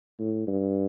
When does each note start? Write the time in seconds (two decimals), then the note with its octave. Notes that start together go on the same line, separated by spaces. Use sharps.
0.19 A2
0.47 G2